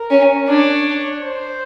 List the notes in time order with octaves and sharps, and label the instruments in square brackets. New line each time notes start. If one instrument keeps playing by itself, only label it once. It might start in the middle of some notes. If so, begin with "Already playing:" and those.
Already playing: [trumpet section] A#4
[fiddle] C#4
[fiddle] D4 [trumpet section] C#5
[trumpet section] C5